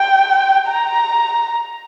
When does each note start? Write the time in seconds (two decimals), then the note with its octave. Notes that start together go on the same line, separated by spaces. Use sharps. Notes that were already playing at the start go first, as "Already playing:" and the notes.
Already playing: G5
0.67 A#5